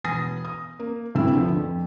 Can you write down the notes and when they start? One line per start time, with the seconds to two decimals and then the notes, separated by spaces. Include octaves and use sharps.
0.04 E1 B3 G#5 D#6 A#6
0.45 D#6
0.80 A#3
1.15 D2 G2 C3 C4 E4 E6
1.33 D3 F3 B3
1.56 F2